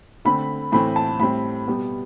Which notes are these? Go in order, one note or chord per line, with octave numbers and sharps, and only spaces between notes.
D3 A3 C4 B5
A2 E3 A3 C4 B5
A5
A2 G3 C4 B5
B2 G3 B3